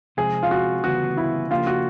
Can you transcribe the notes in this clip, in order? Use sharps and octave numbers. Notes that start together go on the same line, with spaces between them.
C3 F3 G#3 C4 G#4
F4
F#4
D2 C#3 E3 G3 B3 F#4
E4
C#3 F3 A#3 D4 F4 G4
F#4